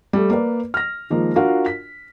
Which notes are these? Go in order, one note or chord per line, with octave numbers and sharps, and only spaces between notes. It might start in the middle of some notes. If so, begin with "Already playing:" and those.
G3 A3
A#3 B4 D5
F6 A#6
D#3 F3 G#3 A#3
D4 F4 F#4 A#4 F5
B6